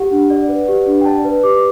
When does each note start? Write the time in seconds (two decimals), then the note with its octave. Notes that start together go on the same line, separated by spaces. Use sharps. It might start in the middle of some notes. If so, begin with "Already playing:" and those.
Already playing: G4 F#5
0.11 D4
0.30 D5
0.48 B4
0.68 G4
0.86 D4
1.01 G5
1.05 D5 A5
1.24 B4
1.43 G4 D6